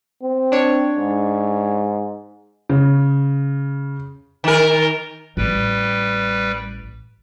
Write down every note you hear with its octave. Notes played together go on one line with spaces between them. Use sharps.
C4
D4 C#5
G#2
C#3
D#3 A#4
A1 G3 B4 G5